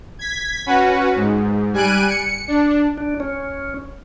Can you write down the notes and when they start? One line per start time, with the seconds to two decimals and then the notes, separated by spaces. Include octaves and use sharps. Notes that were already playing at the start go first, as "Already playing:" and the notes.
0.19 G#6 B6
0.66 C#4 F#4 B4
1.15 G#2
1.73 G3 G#5 F#6 D7 D#7
2.08 C#7
2.48 D4
2.98 D4
3.20 C#4